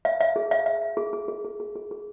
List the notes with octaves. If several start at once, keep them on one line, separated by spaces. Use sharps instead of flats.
E5
E5
G#4
E5
E5
E5
G#4
G#4
G#4
G#4
G#4
G#4
G#4